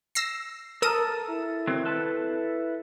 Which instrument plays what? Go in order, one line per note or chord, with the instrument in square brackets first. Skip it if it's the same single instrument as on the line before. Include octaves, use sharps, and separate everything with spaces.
[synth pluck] E6 A#6 C7
[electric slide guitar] A4 A5 [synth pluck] A#4 D#6 D#7
[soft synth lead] E4
[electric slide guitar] D#3 F#3 C4
A4 B4 A5